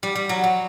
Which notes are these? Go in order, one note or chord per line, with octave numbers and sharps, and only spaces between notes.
G3
G3
F#3
F#3